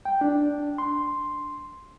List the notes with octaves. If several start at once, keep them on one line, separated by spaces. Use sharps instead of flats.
G5
D4
C6